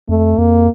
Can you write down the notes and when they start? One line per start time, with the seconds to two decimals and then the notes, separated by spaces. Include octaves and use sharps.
0.09 F2 A3
0.38 F2 A#3